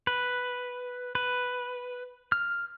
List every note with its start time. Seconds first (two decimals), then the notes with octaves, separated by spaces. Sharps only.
0.07 B4
1.15 B4
2.32 F6